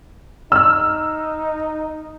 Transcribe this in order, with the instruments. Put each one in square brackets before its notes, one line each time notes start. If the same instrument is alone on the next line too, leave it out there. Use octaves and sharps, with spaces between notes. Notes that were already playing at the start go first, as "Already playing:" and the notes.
[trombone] D#4 [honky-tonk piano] E6 F6